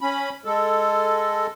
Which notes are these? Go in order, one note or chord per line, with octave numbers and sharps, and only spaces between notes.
C#4 B5
G#3 A4